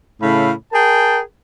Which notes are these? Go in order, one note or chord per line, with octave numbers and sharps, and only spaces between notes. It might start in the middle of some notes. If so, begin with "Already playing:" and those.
A2 C#3 A3 F5 B5
G#4 A#4 G5 A5